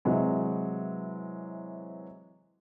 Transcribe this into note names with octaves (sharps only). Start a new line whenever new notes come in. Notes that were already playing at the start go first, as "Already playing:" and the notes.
C3 E3 F#3 G#3